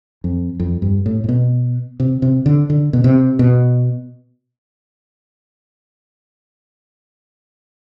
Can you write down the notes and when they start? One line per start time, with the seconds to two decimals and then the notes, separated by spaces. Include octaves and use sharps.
0.24 F2
0.60 F2
0.82 G2
1.06 A2
1.24 A2
1.29 B2
2.00 C3
2.22 C3
2.46 D3
2.70 D3
2.93 B2
3.04 C3
3.39 B2